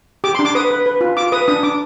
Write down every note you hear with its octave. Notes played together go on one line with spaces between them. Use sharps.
G4 D6
C6
D4
D6
B4 D#6
B4
B4
F4
F4 D6
B4 D#6
D4 D#6
D4 D6